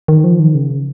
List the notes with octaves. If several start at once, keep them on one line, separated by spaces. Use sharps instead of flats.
D#3
F3
D#3
C#3